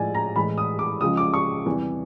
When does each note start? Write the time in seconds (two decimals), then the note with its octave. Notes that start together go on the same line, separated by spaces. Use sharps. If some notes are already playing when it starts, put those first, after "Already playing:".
Already playing: A2 F3 G#3 D5 G#5
0.15 A#5
0.36 A2 E3 G#3 B5
0.58 D#6
0.79 D6
1.01 C#2 C#3 F3 G#3 D#6
1.17 D6
1.34 C#6
1.66 E2 C3 E3 G3